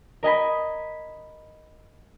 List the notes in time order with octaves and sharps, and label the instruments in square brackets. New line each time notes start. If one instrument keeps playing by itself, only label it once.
[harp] A#4 D#5 G#5 B5